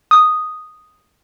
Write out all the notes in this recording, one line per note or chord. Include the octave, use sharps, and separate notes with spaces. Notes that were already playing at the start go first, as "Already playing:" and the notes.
D#6